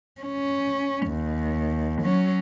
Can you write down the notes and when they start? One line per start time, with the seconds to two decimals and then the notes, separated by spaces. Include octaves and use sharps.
0.21 C#4
1.07 D#2
2.02 F#3 C#4